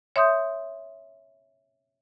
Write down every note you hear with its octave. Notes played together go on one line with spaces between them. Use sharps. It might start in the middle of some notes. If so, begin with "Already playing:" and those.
C#5 E5 C6 D#6 G6